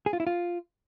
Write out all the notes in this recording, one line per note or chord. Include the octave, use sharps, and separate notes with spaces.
G#4
F4
E4
F4